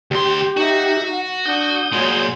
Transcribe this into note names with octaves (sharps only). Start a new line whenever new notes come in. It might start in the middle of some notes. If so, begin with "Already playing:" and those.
D2 G4 C6
D#4 F#4 E5
F#5
D4 F#5 D#6 G6
A#2 G#3 F#4 C#5